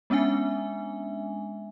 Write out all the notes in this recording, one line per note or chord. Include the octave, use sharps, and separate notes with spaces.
G#3 B3 C#4 D4 E5 G#5